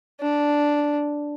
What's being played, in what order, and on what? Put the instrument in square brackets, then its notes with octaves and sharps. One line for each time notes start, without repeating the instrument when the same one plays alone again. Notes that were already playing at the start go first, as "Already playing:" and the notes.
[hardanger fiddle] D4